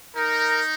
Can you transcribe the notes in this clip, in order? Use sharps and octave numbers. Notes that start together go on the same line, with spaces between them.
D#4 A#4